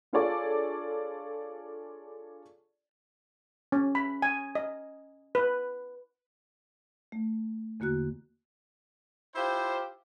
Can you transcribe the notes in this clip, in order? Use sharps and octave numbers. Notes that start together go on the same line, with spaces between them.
D4 F4 G#4 A4 C#5 D5
C#4
B5
G#5
D#5
B4
A3
E2 D3 A#3 F#4 F#6
E4 F4 G4 C5